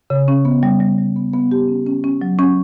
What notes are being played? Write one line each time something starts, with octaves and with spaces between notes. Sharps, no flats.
C#3
C#4
B3
G3
G3
G3
B3
B3
G4
C#4
C#4
C#4
F#3
C#4